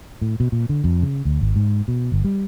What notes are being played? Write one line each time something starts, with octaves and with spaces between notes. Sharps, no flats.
A2
B2
A#2
D3
F2
C#3
D2
G#1
G#2
B2
G1
G3